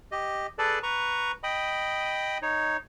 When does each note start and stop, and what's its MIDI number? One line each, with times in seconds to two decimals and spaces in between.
0.12 0.47 67
0.12 0.47 75
0.58 0.79 68
0.58 0.79 69
0.58 0.79 71
0.58 0.79 74
0.58 0.79 81
0.83 1.32 71
0.83 1.32 82
0.83 1.32 85
1.43 2.38 75
1.43 2.38 79
1.43 2.38 83
1.43 2.38 87
2.42 2.77 63
2.42 2.77 73